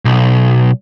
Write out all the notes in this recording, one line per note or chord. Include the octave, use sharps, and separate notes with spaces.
B1